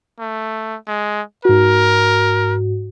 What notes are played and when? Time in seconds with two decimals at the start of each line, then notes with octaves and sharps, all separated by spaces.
0.19 A3
0.87 G#3
1.45 G#2 F#4 A#4